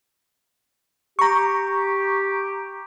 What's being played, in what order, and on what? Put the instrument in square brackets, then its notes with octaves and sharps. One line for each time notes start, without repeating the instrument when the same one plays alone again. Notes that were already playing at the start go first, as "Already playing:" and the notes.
[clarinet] G4 [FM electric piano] A#5 C#6